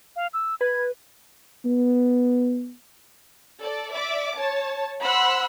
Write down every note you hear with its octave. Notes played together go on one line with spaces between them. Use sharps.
F5
E6
B4 G#6
B3
A4 D5
D5 E5 D6
C#5 A5
C5 F#5 B5 C6 E6 F#6